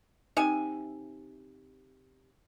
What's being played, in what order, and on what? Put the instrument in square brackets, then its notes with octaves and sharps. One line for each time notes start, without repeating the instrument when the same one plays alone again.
[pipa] C3 E5 G#5 [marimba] D#4